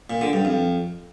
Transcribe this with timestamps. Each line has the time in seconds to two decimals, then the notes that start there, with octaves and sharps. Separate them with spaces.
0.10 A#2
0.21 D3
0.33 G2
0.45 F2